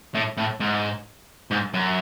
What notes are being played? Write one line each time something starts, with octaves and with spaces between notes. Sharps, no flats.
A2
A2
G#2
G#2
F#2